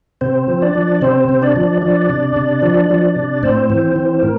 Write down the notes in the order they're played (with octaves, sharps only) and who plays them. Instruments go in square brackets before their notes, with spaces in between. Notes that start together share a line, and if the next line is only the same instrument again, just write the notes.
[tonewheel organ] C3 C4 C5
F3
D4 D5
F3
C3 C4 C5
C3
D4 D5
F3
F3 D4 D5
C3
C3
F3
F3
C3
A2 C4 C5
E3
E3
A2 A#4